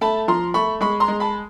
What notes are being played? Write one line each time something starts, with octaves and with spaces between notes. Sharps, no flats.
A3 A5 B5
F3 A#5 C6
A3 B5 C#6
G#3 B5 C#6
A#5 C6
G#3
A5 B5